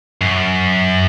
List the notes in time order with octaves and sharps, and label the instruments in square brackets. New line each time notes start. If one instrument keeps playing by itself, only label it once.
[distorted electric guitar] F#2